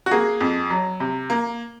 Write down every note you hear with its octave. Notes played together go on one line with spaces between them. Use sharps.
F#4
A#3 G#4
F2
F#3
C3
A#3